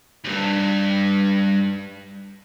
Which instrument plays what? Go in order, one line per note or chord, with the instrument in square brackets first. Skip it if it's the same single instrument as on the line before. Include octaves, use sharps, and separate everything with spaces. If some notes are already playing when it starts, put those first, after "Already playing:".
[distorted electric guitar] D2 G2